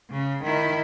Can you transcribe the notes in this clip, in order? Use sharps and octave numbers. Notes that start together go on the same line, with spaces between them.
C#3
D#3 E4